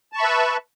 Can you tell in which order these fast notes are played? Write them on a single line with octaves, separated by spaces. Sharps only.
A5 C#6 B5 E5 B4